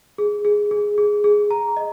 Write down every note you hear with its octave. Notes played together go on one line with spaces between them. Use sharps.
G#4
G#4
G#4
G#4
G#4
A#5
D#5